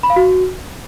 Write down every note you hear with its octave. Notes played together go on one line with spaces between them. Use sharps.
B5
F5
F#4